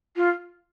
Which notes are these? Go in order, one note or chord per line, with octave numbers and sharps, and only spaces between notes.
F4